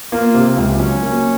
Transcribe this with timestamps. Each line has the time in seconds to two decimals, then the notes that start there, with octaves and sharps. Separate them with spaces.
0.12 A#3 F4
0.34 C3
0.57 C#2
0.80 F#3 C#4
1.02 A#3